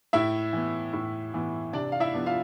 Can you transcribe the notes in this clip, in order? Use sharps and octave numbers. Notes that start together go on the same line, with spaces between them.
A2 E4 E5
E3 B3
A2
E3 B3
C3 D4 D5
F5
E4 E5
F3 B3 D4
F4 F5